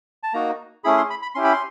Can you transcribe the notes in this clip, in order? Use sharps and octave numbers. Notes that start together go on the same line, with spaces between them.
A5
A#3 D#4 F#4 A#5
A3 C#4 E4 G#4 B5
C6
B5
B5
C#4 E4 G4 C6
B5
C6